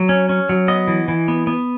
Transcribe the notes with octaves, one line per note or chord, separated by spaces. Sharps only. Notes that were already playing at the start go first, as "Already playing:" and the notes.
Already playing: F#3
C#4
C#4
F#3
B3 D#5
E3
E3
B3
B3